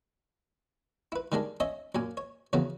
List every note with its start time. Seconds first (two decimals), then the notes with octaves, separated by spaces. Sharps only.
1.12 E4 B4
1.32 D#3 G3 G#3 D4
1.60 C#4 C#5 D#5 E5
1.95 F#2 A#2 G#5
2.17 C#5
2.53 F2 C#3 E3 F#3 B3